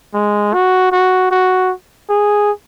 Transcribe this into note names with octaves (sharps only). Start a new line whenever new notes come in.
G#3
F#4
F#4
F#4
G#4